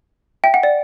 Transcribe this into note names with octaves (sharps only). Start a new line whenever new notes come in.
E5 G5
F#5
D5